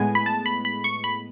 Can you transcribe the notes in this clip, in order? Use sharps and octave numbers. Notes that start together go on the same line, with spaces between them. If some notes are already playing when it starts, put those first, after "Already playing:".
Already playing: A2 G#3 B3 G#5
B5
A5
B5
B5
C#6
B5